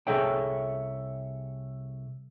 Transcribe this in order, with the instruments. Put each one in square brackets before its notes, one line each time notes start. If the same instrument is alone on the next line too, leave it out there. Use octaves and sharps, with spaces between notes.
[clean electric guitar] C2 G#4 A4 C#5 E5 G5